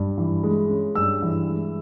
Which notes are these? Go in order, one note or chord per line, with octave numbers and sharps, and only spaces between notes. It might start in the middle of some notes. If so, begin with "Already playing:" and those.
Already playing: G2
E3
G#3
C#4
G2 E6
E3
G#3